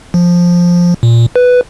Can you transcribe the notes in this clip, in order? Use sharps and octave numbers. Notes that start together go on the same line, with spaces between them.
F3
A#2
B4